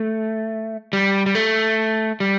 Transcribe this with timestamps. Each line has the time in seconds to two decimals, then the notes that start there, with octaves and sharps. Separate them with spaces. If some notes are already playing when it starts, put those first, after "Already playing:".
Already playing: A3
0.93 G3
1.26 G3
1.35 A3
2.20 G3